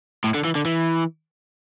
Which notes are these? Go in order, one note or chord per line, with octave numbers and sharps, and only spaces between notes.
A2
D3
E3
D3
E3